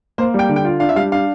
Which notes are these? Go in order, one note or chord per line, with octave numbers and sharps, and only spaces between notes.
A#3 C5
G3 G5
D3
G5
F4
D4 F5
E5
G3 F5
D4 F5